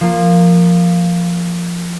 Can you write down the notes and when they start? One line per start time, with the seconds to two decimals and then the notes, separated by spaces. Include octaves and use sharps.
0.01 F3 A#3 F4